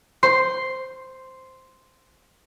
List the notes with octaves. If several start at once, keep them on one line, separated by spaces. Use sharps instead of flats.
C5 C6